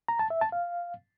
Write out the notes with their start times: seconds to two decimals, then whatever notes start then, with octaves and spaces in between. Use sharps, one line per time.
0.08 A#5
0.19 A5
0.30 E5
0.41 A5
0.52 F5